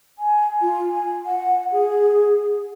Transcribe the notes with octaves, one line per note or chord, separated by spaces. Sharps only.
G#5
F4
G#5
F#5
G#4